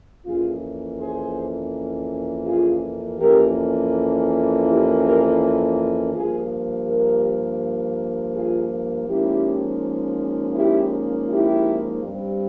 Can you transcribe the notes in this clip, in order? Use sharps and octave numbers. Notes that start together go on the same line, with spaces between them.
F2 E3 A#3 C#4 F4 G#4
G#4 C5
F4 G#4
F2 E3 A#3 C#4 G4 A#4
E4 G4
G4 A#4
G2 F3 A#3 F4 G#4
G4 A#4
F4 G#4
G#2 F3 A#3 C#4 E4 G4
E4 G4
E4 G4
G2 G3 C4